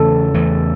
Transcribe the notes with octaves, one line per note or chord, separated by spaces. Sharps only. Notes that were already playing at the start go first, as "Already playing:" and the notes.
Already playing: E2 C#3 E3 A3 A4
E2 C#3 E3 A3